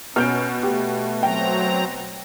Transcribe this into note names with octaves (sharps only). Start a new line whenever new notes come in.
B2 C#4 F6 G6 D7
A3 G4
F#3 C4 G5 A#5